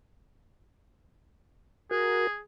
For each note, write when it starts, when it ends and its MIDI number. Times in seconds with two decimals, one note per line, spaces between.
1.91 2.27 66
1.91 2.40 68
1.91 2.27 70